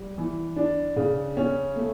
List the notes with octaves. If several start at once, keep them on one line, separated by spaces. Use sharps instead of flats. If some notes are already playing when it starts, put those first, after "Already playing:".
Already playing: G3
E3
D4
C#3
C#4
A3